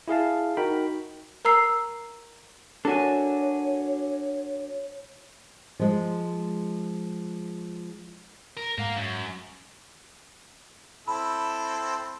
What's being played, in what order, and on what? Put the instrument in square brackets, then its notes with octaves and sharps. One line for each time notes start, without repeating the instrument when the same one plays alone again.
[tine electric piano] E4 G#4 F5 A5
D#4 F#4 A#4 G5 B5
[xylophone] A#4 A#5 E6 C7
[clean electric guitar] D4 A#4 G#5 [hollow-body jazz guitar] F#4 A4 [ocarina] C#5
[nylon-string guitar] F3 G#3
[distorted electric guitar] A#4
[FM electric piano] G#2 F#5 A#5 [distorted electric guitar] A#4 F5
[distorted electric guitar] F#2
[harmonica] C4 E4 A4 [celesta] B5